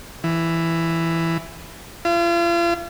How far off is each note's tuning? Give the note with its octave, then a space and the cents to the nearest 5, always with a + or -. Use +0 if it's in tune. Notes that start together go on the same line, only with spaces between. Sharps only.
E3 +5
F4 -40